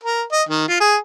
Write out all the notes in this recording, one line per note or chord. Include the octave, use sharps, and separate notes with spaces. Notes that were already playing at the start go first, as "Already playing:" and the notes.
A#4
D#5
D#3
F4
G#4